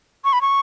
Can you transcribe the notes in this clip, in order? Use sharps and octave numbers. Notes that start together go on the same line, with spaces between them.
C#6
B5
C#6